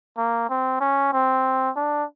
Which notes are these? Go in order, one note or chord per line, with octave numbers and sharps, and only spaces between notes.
A#3
C4
C#4
C4
D4